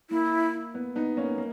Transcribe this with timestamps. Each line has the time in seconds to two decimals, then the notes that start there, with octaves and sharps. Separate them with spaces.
0.10 A#3 E4
0.74 B3
0.96 B3 D#4
1.17 A#3 C#4
1.38 A#3